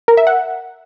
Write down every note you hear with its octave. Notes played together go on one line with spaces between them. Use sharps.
A#4
E5
F#5